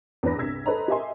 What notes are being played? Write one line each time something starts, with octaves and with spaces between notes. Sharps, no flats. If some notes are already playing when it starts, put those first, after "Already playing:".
E2 G2 B4 A#6
C2 G2 E6 G#6 B6
A4 B4 C5 D#5 A#5
G4 A#4 D#5 E5 G#5 C6